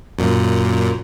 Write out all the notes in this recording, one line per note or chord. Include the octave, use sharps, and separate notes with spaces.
F#2 A#2